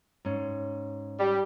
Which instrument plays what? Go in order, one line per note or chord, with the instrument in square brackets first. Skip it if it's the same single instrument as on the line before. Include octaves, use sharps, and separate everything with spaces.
[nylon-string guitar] G#2 C#4
[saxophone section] G3